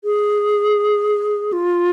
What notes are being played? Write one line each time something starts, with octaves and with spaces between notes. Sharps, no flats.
G#4
F4